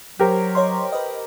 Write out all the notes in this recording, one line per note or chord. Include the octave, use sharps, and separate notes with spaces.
F#3 G4 A#4 C5
C#5 D#5 C6
B4 D#5